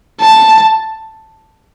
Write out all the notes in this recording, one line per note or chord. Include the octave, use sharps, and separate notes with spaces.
A5